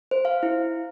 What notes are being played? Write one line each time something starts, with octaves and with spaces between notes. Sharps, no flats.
C5
F5
E4